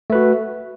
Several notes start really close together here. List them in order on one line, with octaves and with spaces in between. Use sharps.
A3 B4 F#4